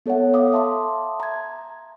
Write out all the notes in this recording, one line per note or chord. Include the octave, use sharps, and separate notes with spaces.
B3 A4 C#5 E5 F#5
E5 F5 D6 D#6
E5 A5 C6 D6
A#5 G#6